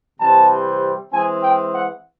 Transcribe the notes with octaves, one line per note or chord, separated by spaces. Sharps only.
C3 E3 G3 C4 A5
E3 G#3 C4 G#5
G5
F#5